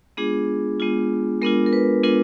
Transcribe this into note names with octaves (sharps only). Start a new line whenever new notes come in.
G#3 B3 D4 F4 G#4
G#3 B3 D4 F4
G#3 B3 D4 F4 A#4
A#4
B4
G#3 B3 D4 F4 A#4